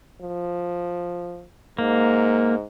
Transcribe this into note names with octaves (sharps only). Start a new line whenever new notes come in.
F3
G#2 A#3